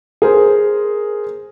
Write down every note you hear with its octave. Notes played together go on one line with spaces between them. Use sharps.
G#4 A#4 C5